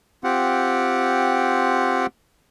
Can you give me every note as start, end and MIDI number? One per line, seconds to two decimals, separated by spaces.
0.24 2.06 60
0.24 2.06 65
0.24 2.06 67
0.24 2.06 78